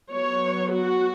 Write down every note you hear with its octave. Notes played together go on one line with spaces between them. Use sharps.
F#3 B3 C#5
F#4